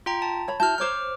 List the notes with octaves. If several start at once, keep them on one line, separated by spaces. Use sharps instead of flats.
F4 G5 A#5
A5
C#5 B5
E4 F#4 A5 F6 G6
C5 C#5 A#5 D6 F6